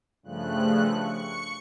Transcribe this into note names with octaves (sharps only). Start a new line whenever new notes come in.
G2 C#3 F3 A3 F#6
C#6 C#7